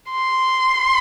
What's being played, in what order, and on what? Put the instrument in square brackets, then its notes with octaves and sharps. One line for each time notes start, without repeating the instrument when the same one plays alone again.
[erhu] C6